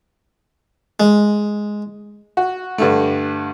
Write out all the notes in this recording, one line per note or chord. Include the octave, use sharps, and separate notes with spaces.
G#3
F#4
G2 D3 A3